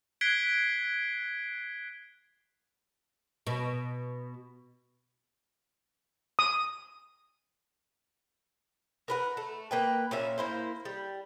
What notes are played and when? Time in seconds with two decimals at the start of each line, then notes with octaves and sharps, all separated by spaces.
0.21 F#6 G#6 B6 C7 D7 G7
3.47 B2
6.39 D#6
9.08 A#4 B4 F#5
9.37 A3
9.71 A#3 B4 G5
10.11 A#2 C#4 E5
10.38 A#3 E4 C5
10.85 G3